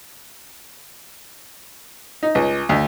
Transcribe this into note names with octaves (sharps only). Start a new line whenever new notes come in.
D#4
C#2
D2